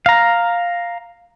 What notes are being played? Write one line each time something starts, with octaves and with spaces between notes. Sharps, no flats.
F5 A#5